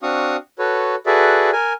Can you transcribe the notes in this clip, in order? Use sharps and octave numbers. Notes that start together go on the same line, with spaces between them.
C4 D4 F#4 F5 C#6 D#6
F#4 A4 B4 C#5
F#4 G#4 A4 B4 D5 E5
A#4 G#5